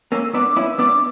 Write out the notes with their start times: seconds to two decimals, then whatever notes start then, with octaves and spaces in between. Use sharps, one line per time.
0.12 A#3 C#4 E6
0.23 E6
0.34 B3 D4 D6
0.57 C#4 E4 E6
0.79 B3 D4 D6